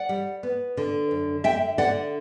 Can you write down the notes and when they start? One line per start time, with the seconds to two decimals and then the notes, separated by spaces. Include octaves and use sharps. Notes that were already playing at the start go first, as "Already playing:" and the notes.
Already playing: D5 F#5
0.09 G3
0.43 B3
0.77 D3
1.11 F#2
1.44 D3 E5 G5
1.78 D3 D5 F#5